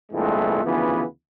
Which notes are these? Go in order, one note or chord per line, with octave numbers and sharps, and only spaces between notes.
C2 G2 A#2 E3 G#3 A3
D2 C#3 E3 F3 B3